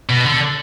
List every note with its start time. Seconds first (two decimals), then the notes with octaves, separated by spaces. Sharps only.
0.09 B2
0.25 D3